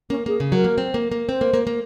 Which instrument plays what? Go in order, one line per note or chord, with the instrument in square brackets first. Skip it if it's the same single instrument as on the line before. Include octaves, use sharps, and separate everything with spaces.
[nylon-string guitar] A#3 [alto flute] C#4
[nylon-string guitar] A#3 [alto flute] G#4
[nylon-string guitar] C#3
[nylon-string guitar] F#3 [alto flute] A#4
[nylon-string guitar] A#3
C4
A#3
A#3
[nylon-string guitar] C4 [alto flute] C5
[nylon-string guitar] A#3
A#3
A#3